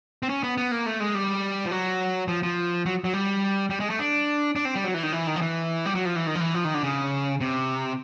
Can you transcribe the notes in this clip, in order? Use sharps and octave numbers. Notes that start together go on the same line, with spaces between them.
C4
C#4
B3
B3
A#3
A3
G#3
G3
F3
F#3
F3
F3
F#3
F#3
G3
G3
G#3
A3
D4
D4
C4
G3
F#3
E3
D#3
E3
D#3
F3
E3
G3
F#3
F3
E3
D#3
F3
E3
F3
D#3
D3
C#3
C3